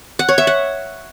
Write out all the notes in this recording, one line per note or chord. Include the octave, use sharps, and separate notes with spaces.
F#5
C#5
E5
F#5